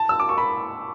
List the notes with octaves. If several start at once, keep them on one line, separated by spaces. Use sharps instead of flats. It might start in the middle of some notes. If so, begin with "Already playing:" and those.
Already playing: A5
E6
D6
C#6
B5